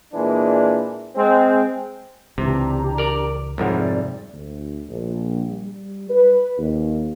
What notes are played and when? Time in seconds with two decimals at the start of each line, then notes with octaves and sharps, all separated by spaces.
0.13 A#2 E3 G#3 D4
1.15 G#3 C4
2.38 C#2 C3 E3 D4 G4 A#5
2.98 A#4 D5
3.58 C2 F2 G#2 G4 C#5 F#5
3.78 D5
4.33 D2
4.89 A#1
5.49 G3
6.10 B4
6.58 D#2